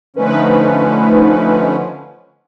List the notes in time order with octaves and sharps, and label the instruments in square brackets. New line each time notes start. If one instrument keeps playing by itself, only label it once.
[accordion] D3 F3 C#4 [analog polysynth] A3 D#4 B4